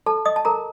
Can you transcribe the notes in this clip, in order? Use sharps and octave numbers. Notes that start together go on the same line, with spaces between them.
A4 A5
D#5 D#6
A5
A4 A#4 A#5